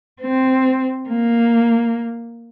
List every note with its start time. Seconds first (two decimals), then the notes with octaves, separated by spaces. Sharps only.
0.22 C4
1.09 A#3